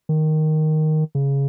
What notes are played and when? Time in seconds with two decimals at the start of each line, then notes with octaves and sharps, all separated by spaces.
0.09 D#3
1.15 C#3